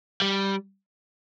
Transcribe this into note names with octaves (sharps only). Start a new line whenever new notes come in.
G3